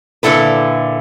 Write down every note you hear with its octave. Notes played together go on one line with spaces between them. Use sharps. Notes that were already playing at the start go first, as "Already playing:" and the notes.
A#2 D3 E4 A4 B4